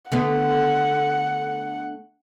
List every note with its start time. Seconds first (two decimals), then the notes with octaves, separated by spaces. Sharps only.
0.12 D3 A3 B3 F#5